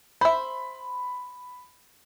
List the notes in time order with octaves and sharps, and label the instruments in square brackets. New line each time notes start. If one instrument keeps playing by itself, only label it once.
[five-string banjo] C5 E5 [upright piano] B5